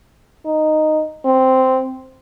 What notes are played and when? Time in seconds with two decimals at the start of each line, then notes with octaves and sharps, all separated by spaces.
0.46 D#4
1.25 C4